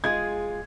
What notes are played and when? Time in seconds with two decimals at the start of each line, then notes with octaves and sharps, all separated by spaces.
0.04 G#3 F4 G#4 G#6